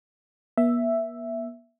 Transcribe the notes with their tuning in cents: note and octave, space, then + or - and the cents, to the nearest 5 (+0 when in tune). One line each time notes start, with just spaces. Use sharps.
B3 -45 E5 +5